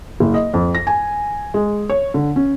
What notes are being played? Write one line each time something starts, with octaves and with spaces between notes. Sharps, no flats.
F#1
D#5
F2
A#6
G#5
G#3
C#5
D3
C#4